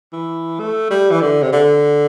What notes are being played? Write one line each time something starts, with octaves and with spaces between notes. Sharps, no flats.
E3
A3
G3
E3
D3
C3
D3